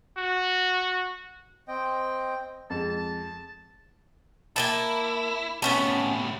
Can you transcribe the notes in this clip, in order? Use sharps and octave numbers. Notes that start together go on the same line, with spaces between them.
F#4
C4 D#5 G5
F2 G#3 A5
A5
A#3 B3 E4 A5
A2 C3 B3 C#4 A5